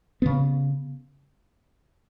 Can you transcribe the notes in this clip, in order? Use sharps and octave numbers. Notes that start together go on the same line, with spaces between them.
C#3 B3